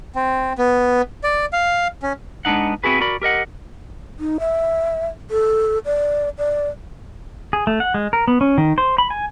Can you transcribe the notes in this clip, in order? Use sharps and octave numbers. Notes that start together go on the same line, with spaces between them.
C4
B3
D5
F5
C#4
G#3 B3 D4 D#4 F#5
B3 C4 E4 F#4 G#4 B4
F#4 A#4 D5 B5
G4 A#4 D#5 F#5
D#4
E5
A4
D5
D5
G#4
A3
F#5
G#3
A#4
B3
C#4
D#3
C5
B5
G#5